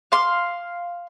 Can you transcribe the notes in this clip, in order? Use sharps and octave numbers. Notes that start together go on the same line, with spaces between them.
F5 C6